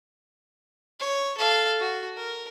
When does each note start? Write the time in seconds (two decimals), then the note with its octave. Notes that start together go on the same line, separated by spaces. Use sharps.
1.00 C#5
1.38 A4 F5
1.80 F#4
2.17 A#4